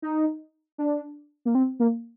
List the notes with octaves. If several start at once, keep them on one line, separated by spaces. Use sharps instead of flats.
D#4
D4
A#3
C4
A#3